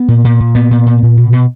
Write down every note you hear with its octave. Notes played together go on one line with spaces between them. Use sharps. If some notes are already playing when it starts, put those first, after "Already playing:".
Already playing: B3
A#2
A#2
A#2
A#2 B3
A#2
A#2
A#2
B2
B2